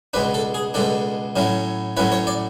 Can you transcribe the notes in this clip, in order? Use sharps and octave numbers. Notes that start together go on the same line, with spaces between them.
C#2 B2 G#3 D4 B4
A4
G#4
C#2 B2 G#3 D4 A4
A2 F#3 C#4 E4
A2 F#3 C#4 E4 B4
C#5
D5